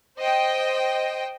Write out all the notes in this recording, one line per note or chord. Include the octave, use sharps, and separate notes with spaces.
C5 D#5 G5